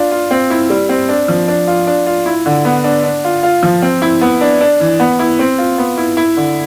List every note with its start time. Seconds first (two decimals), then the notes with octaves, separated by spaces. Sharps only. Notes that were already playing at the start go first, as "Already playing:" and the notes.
Already playing: D4 F4
0.11 F4
0.31 C4
0.50 E4
0.70 G3
0.89 C4
1.09 D4
1.28 F3
1.48 D4
1.68 F4
1.87 D4
2.07 F4
2.26 E4
2.46 D3
2.65 B3
2.84 D4
3.04 D4
3.24 F4
3.43 F4
3.63 F3
3.82 C4
4.02 E4
4.21 B3
4.41 D4
4.61 D4
4.80 E3
5.00 B3
5.19 E4
5.39 C4
5.58 F4
5.78 B3
5.97 E4
6.17 E4
6.37 D3